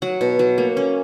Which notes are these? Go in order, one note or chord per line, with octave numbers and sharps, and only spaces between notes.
F#3 F#5
B2
F#3
A#3
C#4